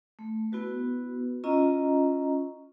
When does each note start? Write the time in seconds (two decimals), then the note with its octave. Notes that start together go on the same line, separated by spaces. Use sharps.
0.19 A3
0.52 B3 E4 F#4 B4
1.44 C#4 E4 F4 D#5 A#5